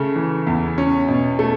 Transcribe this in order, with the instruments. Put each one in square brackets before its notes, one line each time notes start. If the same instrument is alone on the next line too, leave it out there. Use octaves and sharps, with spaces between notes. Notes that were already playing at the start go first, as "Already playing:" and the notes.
Already playing: [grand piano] C#3 A3
E3
E2
C#4
B2
A3